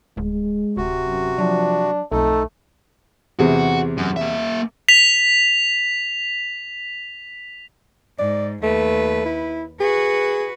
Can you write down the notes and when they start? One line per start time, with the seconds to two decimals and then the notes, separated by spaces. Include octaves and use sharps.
0.17 D1 G#3
0.77 D1 C3 F#4
1.07 F#2
1.39 F3 F#3 D4
2.12 B1 F2 A3 D#4 A4
3.39 E2 C3 F#4 G#4
3.97 F#2
4.16 A#3 E5
4.89 B6 F7
8.19 G#2 D5
8.63 D#2 A3 B4
9.25 E4
9.80 F#4 G#4 B4